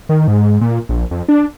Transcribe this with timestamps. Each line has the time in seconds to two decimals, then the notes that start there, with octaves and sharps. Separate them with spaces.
0.09 D#3
0.28 G#2
0.61 A#2
0.89 A#1
1.11 F2
1.29 D4